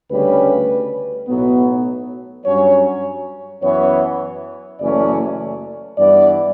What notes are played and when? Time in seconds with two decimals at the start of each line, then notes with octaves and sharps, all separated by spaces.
0.11 D2 C#3 G3 C#4 B4
1.28 B1 A2 F#3 B3
2.46 G2 F#3 C#4 C#5
3.63 F#2 E3 B3 C#5
4.80 F#1 F#2 E3 A3 C#4 D5
5.97 G2 E3 B3 D5